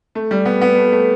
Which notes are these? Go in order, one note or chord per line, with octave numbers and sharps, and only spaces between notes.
A3
G3
B3
B3
A3
A3